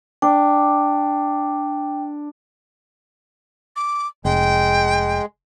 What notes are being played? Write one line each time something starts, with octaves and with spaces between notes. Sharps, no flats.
D4 G5
D6
F1 G#3 G5